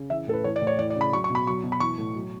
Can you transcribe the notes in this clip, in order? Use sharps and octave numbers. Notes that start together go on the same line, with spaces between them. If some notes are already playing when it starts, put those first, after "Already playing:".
Already playing: C#3
E3 E5
A2 A4
B4
E3 C#5
D5
A2
C#5
E3 D5
D5
C#3
B5
F#3 C#6
C#6
B2
B5
F#3 C#6
B2
B5
E3 C#6
A2
F#3